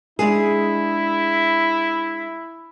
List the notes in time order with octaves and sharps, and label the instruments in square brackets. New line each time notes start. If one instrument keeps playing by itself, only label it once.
[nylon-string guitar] G#3 D4 G#4 [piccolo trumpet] E4